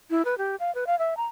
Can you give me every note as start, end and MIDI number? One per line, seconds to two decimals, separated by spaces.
0.10 0.25 64
0.25 0.38 71
0.38 0.56 67
0.60 0.73 77
0.75 0.84 71
0.87 0.98 77
0.99 1.14 76
1.17 1.25 82